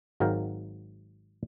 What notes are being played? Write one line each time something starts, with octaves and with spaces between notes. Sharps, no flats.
G#1 G#2 F#3 A#4 F5 G5